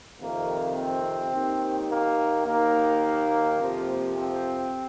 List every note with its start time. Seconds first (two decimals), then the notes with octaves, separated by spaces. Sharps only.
0.20 F2 C3 D#3 A#3
0.77 C4
1.33 D#2 D#3
1.89 A#3
2.45 D#2 D#3 A#3
3.58 F2 C3 F3
4.14 C4